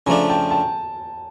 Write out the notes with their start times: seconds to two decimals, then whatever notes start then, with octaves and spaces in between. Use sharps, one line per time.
0.07 C#3 F3 A3 D4 G#5 A#5
0.29 G5 A5
0.51 G5 A5